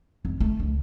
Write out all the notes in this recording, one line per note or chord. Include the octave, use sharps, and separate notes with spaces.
F2
A3
C#2